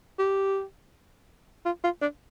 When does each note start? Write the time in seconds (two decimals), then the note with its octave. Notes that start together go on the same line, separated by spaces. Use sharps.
0.19 G4
1.65 F4
1.84 F4
2.02 D4